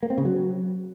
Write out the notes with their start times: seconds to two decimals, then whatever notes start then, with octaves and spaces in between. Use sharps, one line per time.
0.03 A#3
0.10 C4
0.18 C#3
0.25 F#3